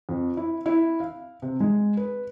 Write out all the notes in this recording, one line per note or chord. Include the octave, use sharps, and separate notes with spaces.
F2
E4
E4
F5
C3
G#3
B4